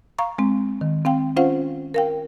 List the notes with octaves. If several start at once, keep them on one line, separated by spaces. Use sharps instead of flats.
F5 A#5 C#6
G#3 C4
D#3
C4 F5 G5
C#4 F4 C5 F5 F#5
A#4 F5 G5